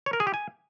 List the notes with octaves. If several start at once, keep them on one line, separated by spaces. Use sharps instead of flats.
C#5
A#4
G#4
G4
G#5